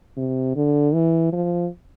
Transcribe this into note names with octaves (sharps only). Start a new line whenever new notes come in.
C3
D3
E3
F3